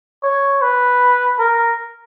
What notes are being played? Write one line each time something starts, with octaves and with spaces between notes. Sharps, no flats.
C#5
B4
A#4